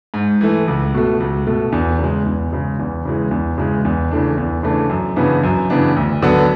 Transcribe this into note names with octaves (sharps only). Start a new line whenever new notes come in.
G#2
E3 A3
C#2
B2 A3
C#2
B2 A3
E2
C#3
G#3
E2
C#3 G#3
E2
C#3 E3 G#3
E2
C#3 E3 G#3
E2
C#3 E3 A3 D4
E2
C#3 E3 A3 D4
F#2
C#3 E3 B3 D4
F#2
C#3 E3 B3 D4
D2
D3 F#3 B3